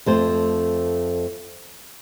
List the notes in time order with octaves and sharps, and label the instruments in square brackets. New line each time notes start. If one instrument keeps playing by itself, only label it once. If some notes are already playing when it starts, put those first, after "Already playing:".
[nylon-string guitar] F2 A3 C5